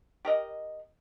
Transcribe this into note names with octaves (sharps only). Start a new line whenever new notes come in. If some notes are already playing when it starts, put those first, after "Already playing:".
G4 A#4 D#5